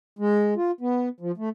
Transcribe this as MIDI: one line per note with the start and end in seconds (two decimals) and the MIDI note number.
0.19 0.54 56
0.57 0.71 65
0.81 1.09 59
1.20 1.32 53
1.37 1.49 57